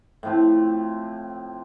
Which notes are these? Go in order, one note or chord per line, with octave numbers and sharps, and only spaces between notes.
A2 F3 C4